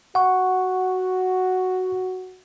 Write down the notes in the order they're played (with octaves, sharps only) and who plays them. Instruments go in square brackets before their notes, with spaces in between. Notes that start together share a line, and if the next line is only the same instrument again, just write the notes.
[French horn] F#4 [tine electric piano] F#5 C#6